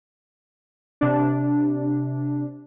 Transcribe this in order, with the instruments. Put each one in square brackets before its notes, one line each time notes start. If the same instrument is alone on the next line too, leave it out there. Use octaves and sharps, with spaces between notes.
[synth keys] C3 D4